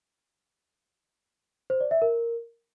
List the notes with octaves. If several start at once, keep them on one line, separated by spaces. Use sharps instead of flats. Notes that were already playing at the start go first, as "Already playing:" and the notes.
C5
D5
E5
A#4